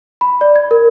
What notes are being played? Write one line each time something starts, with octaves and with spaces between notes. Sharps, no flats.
B5
D5
G#6
A#4